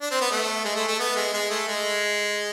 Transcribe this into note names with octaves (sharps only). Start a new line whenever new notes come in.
D4
C4
B3
A3
G#3
A3
A3
B3
G#3
G#3
A3
G#3